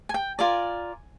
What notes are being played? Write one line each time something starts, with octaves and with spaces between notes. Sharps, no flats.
G#5
G5
F4 A#4 D5 G#5